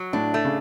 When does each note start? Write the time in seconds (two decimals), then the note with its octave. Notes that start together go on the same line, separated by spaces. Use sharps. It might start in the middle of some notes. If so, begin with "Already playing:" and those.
Already playing: F#3
0.13 A2 D4
0.34 A3
0.45 C#3